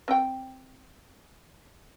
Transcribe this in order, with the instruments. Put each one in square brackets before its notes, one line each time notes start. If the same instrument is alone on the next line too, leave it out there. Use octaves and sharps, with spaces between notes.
[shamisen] C4 G5